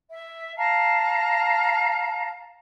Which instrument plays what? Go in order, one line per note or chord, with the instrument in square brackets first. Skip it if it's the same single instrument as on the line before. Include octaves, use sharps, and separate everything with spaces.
[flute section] E5
F5 A5 A#5